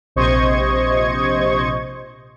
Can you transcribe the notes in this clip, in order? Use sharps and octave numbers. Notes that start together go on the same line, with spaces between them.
A#1 C3 C5 D#5 C#6 G#6